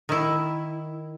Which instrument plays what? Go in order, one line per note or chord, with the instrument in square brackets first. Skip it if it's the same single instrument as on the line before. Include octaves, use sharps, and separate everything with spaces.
[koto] D#3 E4